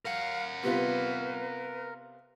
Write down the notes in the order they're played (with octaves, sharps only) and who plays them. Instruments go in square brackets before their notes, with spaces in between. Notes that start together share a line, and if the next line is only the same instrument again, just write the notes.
[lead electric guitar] A#4 F#5 [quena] F5
[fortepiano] C3 B3 F4 [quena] B4